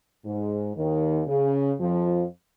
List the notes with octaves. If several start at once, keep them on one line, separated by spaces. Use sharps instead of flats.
G#2
D#2 D#3
C#3
F2 F3